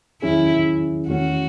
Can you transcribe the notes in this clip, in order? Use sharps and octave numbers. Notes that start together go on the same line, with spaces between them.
E2 D#3 F#3 C#4 E4 G#4
E2 D#3 A3 C#4 F#4